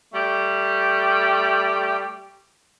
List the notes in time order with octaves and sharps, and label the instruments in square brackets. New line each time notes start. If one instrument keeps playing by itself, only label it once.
[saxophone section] G3 A3 G4